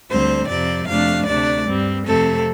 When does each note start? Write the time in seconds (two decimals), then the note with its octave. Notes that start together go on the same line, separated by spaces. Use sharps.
0.11 D2 D3 G3 C4 C5
0.49 F2 C3 F3 C4 D5
0.88 F2 C3 A3 D4 F5
1.27 D2 C3 A3 D4 D5
1.66 G2 G3 C4
2.05 F2 C3 A3 C4 A4